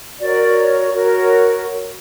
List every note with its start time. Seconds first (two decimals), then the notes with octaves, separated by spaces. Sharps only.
0.18 F#4 A#4 C#5 D5
0.92 F#4 A#4 C#5